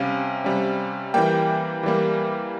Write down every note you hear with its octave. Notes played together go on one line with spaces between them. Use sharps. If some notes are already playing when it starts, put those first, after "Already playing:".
Already playing: C3 G3 C#4 F5
C3 G3 C#4
E3 G3 A#3 G5
E3 G3 A#3